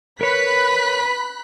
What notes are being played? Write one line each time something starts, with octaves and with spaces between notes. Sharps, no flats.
A#4 B4 C#5 B5 F#6 B6